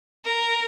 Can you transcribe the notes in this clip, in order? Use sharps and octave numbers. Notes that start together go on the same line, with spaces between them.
A#4